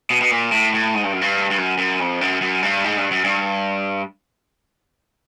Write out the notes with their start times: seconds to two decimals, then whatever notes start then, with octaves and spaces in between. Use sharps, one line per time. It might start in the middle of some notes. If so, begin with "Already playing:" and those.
0.10 B2
0.21 B2
0.31 A#2
0.52 A2
0.74 A2
0.95 G#2
1.04 G2
1.13 F#2
1.21 G2
1.51 G2
1.58 F#2
1.78 F#2
2.00 F2
2.21 F#2
2.41 F#2
2.62 G2
2.84 G#2
2.97 G2
3.11 F#2
3.24 G2